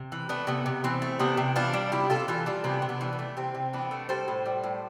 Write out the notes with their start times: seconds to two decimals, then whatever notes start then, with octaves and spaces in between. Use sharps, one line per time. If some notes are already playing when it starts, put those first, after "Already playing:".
Already playing: C3
0.12 E3
0.29 A3 B3 D4
0.47 C3 B3
0.66 C3
0.84 E3 C4
1.02 A3
1.19 C3 B3 D4
1.37 C3
1.56 E3 D4 F4
1.74 G3
1.92 C3 E4 G4
2.10 C3 F4 A4
2.28 E3 F4 A4
2.46 G3 F4 A4
2.64 C3 B3 D4
2.82 C3
2.89 B3 D4
3.01 E3
3.13 B3
3.19 A3
3.37 C3 C4
3.55 C3
3.73 E3 B3 D4
3.91 A3
4.09 G3 A4 C5
4.28 A2
4.46 G3
4.63 A2